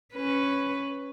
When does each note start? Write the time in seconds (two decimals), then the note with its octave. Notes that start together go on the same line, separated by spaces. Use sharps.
0.14 C#4 B4